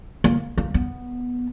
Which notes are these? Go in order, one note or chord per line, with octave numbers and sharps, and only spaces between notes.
A#3
A#3
B3